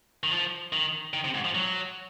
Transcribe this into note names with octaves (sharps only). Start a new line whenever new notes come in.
D#3
F3
D#3
D#3
C3
G#2
F3
F#3